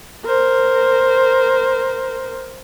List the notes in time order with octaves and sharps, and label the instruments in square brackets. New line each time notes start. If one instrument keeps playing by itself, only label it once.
[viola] A#4 C5